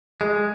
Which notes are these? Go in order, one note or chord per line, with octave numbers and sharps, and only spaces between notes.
G#3